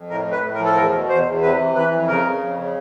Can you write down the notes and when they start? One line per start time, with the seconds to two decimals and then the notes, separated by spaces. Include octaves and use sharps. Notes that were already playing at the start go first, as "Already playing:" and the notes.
Already playing: F2
0.10 A2 A#4
0.26 A2
0.32 B4
0.43 A2
0.54 A#4
0.59 F3
0.66 A4
0.76 E2 A#4
0.92 B2
1.09 E2 C5
1.26 E2
1.42 C3 B4
1.59 E3
1.75 E3 B4
1.91 F2
2.08 C#3 A#4
2.24 C#3
2.41 F2
2.57 C#3